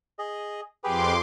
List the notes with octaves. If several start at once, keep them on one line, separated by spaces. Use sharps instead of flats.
G#4 D#5
F2 G4 G#4 B4 C6 D6